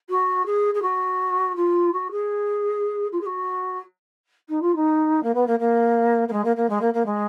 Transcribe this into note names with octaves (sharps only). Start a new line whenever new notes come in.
F#4
G#4
G#4
F#4
F4
F#4
G#4
F4
G#4
F#4
D#4
F4
D#4
A#3
B3
A#3
A#3
A#3
G#3
A#3
A#3
G#3
A#3
A#3
G#3